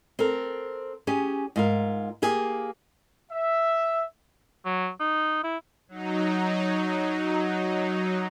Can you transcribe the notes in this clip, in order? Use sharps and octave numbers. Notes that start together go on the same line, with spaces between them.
C4 A4 A#4
C#4 G4 G#4
G#2 F4 A#4
A#3 G4 G#4
E5
F#3
D#4
E4
F#3 D#4